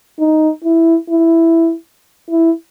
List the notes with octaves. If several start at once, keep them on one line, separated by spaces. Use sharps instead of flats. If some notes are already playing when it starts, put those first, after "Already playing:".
D#4
E4
E4
E4